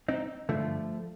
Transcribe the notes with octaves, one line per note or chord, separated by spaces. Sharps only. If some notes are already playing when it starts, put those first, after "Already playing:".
C4 D#4
G2 D3 F3 A3